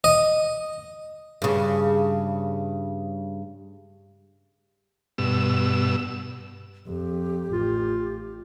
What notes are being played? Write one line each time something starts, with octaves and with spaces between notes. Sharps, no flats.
D#5
G2 C#3
G2 B2 E6
F2 G4
A1 F4